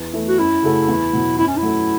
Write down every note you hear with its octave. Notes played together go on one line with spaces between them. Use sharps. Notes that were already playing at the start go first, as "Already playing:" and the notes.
Already playing: E2
E3 A3 E4
F#4
F#2 E4
C#3 A3 F#4 A4
E2
B2 F#3
F#2 E4
C#4
E4
F#3 A3